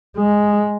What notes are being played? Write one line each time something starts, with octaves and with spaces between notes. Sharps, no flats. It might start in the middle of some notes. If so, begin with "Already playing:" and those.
G#3